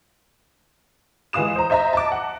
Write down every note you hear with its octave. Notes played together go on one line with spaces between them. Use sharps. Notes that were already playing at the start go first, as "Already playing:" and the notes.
E3 G#3 F5 D#6 E7
C5 A#5
C5 D#5 E5 A#5 A#6
A5 D6
F#5